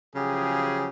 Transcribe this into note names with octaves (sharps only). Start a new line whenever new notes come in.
C#3 F3 F#3 G4 G#4